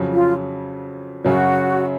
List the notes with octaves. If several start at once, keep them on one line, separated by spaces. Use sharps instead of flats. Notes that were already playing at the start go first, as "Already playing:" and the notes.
Already playing: F2 C#3 F#3
F4
F#2 C#3 F#3 F#4